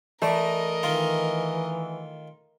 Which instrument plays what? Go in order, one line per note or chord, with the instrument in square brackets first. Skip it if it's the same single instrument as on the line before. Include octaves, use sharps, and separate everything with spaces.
[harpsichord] E3 D5 [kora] A3 [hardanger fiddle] A#4 D#5
[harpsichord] D#3 F4 [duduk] E3